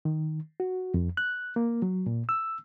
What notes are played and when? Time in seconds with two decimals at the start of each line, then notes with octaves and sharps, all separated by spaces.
0.05 D#3
0.60 F#4
0.94 F2
1.17 F#6
1.56 A#3
1.82 F#3
2.06 A#2
2.29 E6